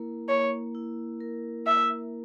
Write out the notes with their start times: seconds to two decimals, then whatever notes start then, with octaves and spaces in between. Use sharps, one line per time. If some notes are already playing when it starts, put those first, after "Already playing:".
Already playing: A#3 E4 A#4
0.29 A#3 C#5
0.75 E4
1.21 A#4
1.67 A#3 E5